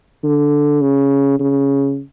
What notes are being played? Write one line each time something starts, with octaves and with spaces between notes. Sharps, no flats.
D3
C#3
C#3